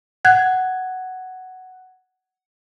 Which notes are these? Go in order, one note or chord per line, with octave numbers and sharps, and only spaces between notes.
F#5 F#6 G#6